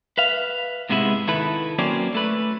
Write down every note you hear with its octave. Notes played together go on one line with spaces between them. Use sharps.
B4 E5 F5
G#2 C3 G#3 B3 E4
D#3 E4 A4 B4
F#3 A#3 C4 C#4 D5
A3 B4